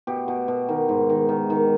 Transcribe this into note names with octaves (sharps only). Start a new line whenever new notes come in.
B2 G4
B2
B2
D#3
G#2
D#3
D#3
D#3